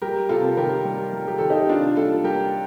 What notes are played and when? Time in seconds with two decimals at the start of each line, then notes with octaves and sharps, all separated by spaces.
0.02 G3 G4 A#4
0.29 C3 F4 A4
0.57 D#3 G4 A#4
0.85 G3
1.13 G3
1.28 G4
1.38 D#3 A4
1.49 D#4 G4
1.69 C3 D4 F4
1.96 G3 F4 A4
2.24 G3 G4 A#4